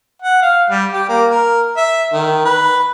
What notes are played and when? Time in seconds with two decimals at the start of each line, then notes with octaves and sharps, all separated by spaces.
0.22 F#5
0.42 F5
0.70 G3
0.92 G4
1.09 A#3
1.31 A#4
1.77 E5
2.13 D#3
2.45 B4